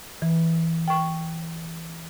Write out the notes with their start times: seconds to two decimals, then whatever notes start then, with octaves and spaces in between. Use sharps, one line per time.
0.22 E3
0.88 G5 C#6